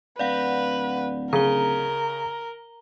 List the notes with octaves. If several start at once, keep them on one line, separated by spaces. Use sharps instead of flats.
D1 B4 D5 F5 F#5
C#3 A#4 A#5 G7